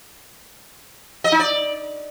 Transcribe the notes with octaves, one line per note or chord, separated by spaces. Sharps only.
D#5
D#4
D5